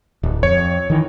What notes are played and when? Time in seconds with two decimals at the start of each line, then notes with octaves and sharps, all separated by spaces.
0.23 D1
0.43 F2 C#5
0.90 D#3 E3